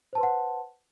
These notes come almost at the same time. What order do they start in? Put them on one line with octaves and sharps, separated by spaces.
C5 A5 B4 C6 F#5